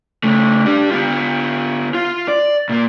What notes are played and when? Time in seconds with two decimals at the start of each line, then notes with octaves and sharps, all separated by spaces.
0.24 C#3 A3
0.66 D4 G4
0.91 B3 F4
1.94 F4
2.28 D5
2.69 A#2 A#3